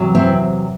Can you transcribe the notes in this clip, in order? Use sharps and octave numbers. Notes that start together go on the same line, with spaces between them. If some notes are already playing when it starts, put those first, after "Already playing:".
Already playing: E2 C3 F#3
C4 E4